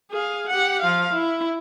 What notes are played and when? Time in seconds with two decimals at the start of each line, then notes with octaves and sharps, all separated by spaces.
0.11 G#4 F5
0.48 G4 F#5
0.81 F3 F5
1.13 E4